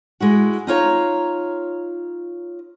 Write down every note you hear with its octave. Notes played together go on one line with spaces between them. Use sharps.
G#3 E4 F#4
D#4 F4 C#5 A#5